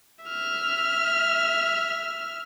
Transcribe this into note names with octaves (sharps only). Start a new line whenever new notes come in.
E5 F6